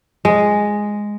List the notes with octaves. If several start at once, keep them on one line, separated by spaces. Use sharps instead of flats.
G#3